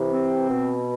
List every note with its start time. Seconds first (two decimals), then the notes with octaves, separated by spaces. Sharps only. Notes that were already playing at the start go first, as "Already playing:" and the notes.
Already playing: C3 E3
0.10 C4
0.48 B2